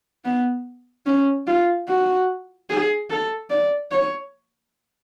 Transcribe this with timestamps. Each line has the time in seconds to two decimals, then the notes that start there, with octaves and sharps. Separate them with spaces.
0.25 B3
1.06 C#4
1.47 F4
1.88 F#4
2.70 G#4
3.10 A4
3.50 D5
3.91 C#5